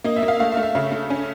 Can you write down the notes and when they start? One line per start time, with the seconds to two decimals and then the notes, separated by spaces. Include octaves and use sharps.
0.04 A#3 D#5
0.16 E5
0.23 A#3
0.28 F5
0.40 A3 F5
0.52 E5
0.57 A3
0.63 E5
0.75 C#3 E5
0.92 A3
1.10 C#4